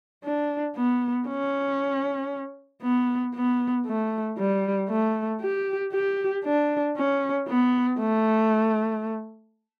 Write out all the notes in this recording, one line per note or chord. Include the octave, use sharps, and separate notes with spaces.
D4
B3
C#4
B3
B3
A3
G3
A3
G4
G4
D4
C#4
B3
A3